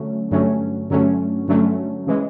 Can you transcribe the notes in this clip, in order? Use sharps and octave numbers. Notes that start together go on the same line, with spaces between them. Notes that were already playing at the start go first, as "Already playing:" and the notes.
Already playing: D3 F#3 A3 C#4
G2 D3 F#3 A3 C#4
G2 D3 F#3 A3 C#4
G2 D3 F#3 A3 C#4
C#3 E3 G#3